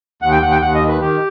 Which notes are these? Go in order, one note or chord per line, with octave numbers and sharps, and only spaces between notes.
D#2 F#5
G5
D#2 F#5
G5
D#2 F#5
D#5
D#3
B4
D#3 G4